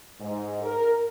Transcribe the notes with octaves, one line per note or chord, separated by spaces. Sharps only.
G#2
A#4